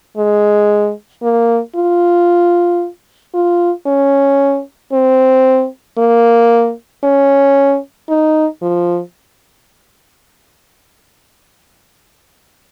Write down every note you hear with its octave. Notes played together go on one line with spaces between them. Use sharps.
G#3
A#3
F4
F4
C#4
C4
A#3
C#4
D#4
F3